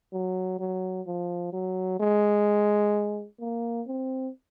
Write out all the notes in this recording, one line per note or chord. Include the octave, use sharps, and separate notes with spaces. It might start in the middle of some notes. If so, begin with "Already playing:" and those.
F#3
F#3
F3
F#3
G#3
A#3
C4